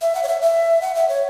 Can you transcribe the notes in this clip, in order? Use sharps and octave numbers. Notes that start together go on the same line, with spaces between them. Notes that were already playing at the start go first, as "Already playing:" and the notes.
E5
F#5
C#5
E5
E5
F#5
E5
C#5